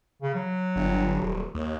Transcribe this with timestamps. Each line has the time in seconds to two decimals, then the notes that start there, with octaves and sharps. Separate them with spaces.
0.22 C#3
0.34 F#3
0.76 G1
1.19 D#1
1.55 D#2